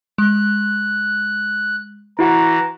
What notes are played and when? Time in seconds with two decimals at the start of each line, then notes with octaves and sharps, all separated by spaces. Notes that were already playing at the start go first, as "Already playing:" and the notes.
0.18 G#3 F#6
2.19 E3 E4 F#4 F#5 A#5